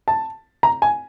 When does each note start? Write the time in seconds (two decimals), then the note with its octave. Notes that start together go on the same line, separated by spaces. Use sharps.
0.08 A5
0.63 A#5
0.82 G#5